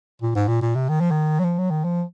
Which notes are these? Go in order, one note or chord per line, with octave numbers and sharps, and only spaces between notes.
A#2
G#2
A#2
A#2
C3
D#3
F3
D#3
F#3
F3
F#3
D#3
F3